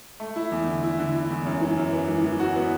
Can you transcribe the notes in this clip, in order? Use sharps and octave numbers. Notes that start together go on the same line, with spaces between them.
A3
E4
E2
D3
E4
D3
E4
E2
F#2
E3
F#2
B3
E3
E3
F#4
B3